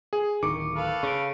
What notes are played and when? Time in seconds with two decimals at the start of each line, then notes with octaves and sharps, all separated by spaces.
0.13 G#4
0.43 D1 D#3 C#6 D6 C#7
0.75 A4 B4 F5
1.03 C#3 C#6 D7